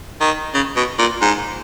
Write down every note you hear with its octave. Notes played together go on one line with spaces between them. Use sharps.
D#3
C#3
B2
A#2
G#2